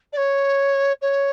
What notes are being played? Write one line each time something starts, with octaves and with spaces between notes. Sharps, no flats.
D5
C#5
C#5